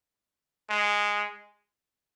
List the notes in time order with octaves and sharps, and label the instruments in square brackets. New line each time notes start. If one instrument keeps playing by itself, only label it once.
[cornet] G#3